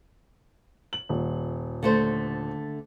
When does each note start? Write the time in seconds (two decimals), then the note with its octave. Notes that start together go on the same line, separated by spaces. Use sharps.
0.93 F#7
1.09 D#1
1.83 D3 A3 C5